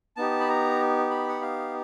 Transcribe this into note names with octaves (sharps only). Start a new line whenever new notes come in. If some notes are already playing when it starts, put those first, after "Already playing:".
B3 D#4 G4 A5
B5
A#5
B5
F#5
F5